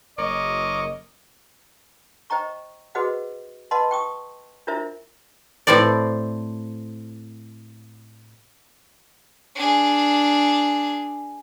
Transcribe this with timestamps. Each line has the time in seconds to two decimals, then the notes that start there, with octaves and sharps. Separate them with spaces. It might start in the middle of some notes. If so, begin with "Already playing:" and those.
0.18 F#1 A#4 C#5 D#5 D6
2.30 C5 D#5 G5 A#5 C#6
2.95 F#4 G#4 B4 C5 D#5 F#5
3.71 B4 D#5 F#5 A5 B5 C6
3.91 G5 C#6 D#6
4.67 D4 E4 F4 A#4 C5 E5
5.67 A2 C4 A4 C5 D5
9.55 D4 G#4